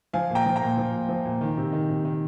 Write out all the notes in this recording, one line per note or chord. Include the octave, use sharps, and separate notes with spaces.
F3 F5 G#5
A#2
G5 A#5
F3
G5 A#5
A#2
F3
A#2
F3
A#2
D#3
C3
D#3
C3
D#3